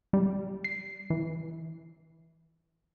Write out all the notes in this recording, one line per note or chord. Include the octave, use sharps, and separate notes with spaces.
G3
C7
E3